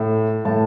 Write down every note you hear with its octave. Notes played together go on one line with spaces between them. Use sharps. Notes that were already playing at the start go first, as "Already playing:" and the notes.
Already playing: A2
A2 A5